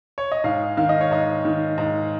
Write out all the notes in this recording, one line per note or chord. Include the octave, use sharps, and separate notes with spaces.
C#5
D#5
G#2 F5
D#3 F5
D#5
C#5
G#2 D#5
D#3
G#2